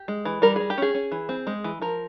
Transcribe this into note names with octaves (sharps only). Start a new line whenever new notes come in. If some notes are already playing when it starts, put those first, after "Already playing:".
Already playing: G4
G#3
E3
G3 A#4
G3 G#4
G4
C#4 G#4
C#4
E3
C4
G#3
E3
F3 A#4